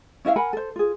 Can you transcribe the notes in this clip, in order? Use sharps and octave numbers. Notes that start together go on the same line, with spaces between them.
C#4 E4 E5 F5
A#4 F#5 G#5 B5
A4 C5
F4 G#4